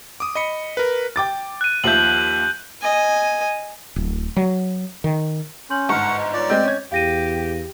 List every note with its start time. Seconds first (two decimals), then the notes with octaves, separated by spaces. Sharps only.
0.20 D6 D#6
0.35 D#5 B5 C#7
0.77 A#4 B4
1.16 G5 D6 A6
1.61 F#6 D#7
1.84 D#2 F3 E5 G6 F#7
2.81 D#5 G#5
3.96 D1
4.37 F#3
5.04 D#3
5.70 C#4 C6 G6 F#7
5.89 G1 G#2 F#5 A5 C#6 F6
6.17 D#5
6.33 F4 C#5 D5
6.49 G#3 C4 D#5 G6
6.63 C#4 G#6
6.92 E2 G4 F5 A#6 D#7